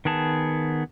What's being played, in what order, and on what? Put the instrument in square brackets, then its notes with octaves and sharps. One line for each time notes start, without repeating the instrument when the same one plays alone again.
[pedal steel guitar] D#3 B3 G#4 A5